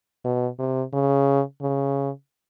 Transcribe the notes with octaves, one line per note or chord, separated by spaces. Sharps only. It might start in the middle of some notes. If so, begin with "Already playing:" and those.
B2
C3
C#3
C#3